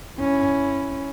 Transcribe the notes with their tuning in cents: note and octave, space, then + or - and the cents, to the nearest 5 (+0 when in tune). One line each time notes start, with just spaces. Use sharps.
C#4 +0 E4 +0